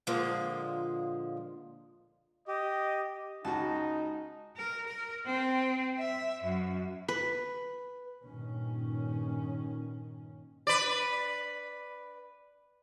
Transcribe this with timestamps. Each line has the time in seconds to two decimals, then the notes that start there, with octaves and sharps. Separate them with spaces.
0.07 A#2 D3 F3 G#3 A#3
2.48 G4 D#5
3.45 C#2 D#4 F#4 A5 A#5
4.57 A#4
4.87 A#4
5.26 C4
5.98 E5
6.43 F#2
7.08 B4
8.24 G2 A#2 D#3 C#4
10.67 B4 D5